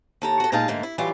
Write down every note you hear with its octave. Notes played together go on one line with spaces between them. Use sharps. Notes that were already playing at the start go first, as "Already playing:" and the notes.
D#2 A4 A#5
F#4 A4
A#2 G#3 A#3 D#4 F5 A5
G#2 D3 A3 A#3
E4
E3 F#3 G3 F4 D5